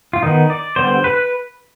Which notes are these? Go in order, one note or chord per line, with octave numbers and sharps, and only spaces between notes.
F4
D#3 B3 D#4
D5
D3 G3 B3 C5
B4